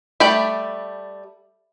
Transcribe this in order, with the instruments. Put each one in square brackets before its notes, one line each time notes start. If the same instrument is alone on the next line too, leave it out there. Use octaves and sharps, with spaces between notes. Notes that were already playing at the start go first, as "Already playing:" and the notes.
[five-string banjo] G3 A3 G5 [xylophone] E5 B5 F#7